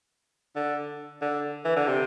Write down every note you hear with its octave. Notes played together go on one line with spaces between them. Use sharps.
D3
D3
E3
D3
C3